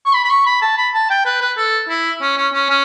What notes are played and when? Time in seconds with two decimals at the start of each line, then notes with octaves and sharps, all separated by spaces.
0.05 C#6
0.14 B5
0.24 B5
0.30 C#6
0.46 B5
0.62 A5
0.78 B5
0.94 A5
1.10 G5
1.25 B4
1.41 B4
1.57 A4
1.89 E4
2.21 C#4
2.37 C#4
2.53 C#4
2.69 C#4